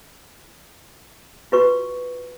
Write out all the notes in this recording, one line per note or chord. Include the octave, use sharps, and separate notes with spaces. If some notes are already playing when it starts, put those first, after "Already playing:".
F4 F#4 B4 C#6